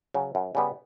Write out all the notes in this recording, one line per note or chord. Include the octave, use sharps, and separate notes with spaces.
C#3 F#3
F#2
C#3 G3 B3